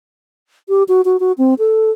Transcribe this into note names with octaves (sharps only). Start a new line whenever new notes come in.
G4
F#4
F#4
F#4
C4
A4